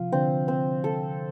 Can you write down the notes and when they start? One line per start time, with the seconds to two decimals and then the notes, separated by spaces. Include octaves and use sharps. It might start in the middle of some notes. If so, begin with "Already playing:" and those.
Already playing: C3 F3 F4
0.12 D3 C4
0.48 C4
0.84 A4